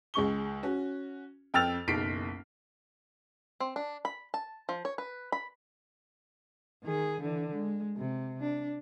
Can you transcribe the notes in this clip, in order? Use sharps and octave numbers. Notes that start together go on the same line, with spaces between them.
C#2 G#3 C#6 G7
C#4 F#4
F2 G5 E6 F6 A6 F7
F#1 B1 B6 C7 D7
C4
D4
B5
A5
F3
C#5
B4
B5
D#3 G#4
D3 E3
G#3
C3
D4